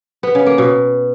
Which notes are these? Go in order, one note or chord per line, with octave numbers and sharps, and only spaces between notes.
B3
C#3
A#3
B2